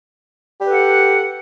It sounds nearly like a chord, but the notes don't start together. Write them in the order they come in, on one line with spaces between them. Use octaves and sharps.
G4 B4 A4 F#5